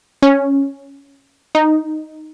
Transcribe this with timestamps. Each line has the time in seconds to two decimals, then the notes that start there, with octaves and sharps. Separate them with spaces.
0.23 C#4
1.55 D#4